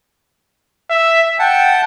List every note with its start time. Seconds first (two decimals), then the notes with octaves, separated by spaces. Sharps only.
0.90 E5
1.39 F#5 G5 A5